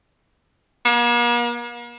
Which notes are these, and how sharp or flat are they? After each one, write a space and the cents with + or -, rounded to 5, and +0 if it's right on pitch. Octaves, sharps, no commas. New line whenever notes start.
A#3 +45